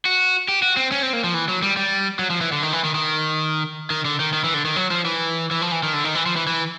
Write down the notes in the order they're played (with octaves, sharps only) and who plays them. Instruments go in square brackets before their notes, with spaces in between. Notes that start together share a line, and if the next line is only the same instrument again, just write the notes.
[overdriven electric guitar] F#4
G4
F#4
C4
C#4
C4
A#3
F3
E3
F#3
G3
G3
F#3
F3
E3
D3
D#3
E3
D#3
D#3
D#3
D3
D#3
D#3
E3
D3
D#3
F#3
F3
E3
E3
F3
E3
D#3
D3
D#3
E3
F3
E3
E3